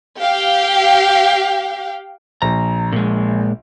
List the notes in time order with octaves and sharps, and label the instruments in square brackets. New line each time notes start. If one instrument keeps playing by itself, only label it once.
[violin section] G4 F5 G5
[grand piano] A#1 [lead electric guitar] A#5
[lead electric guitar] A#2 G#3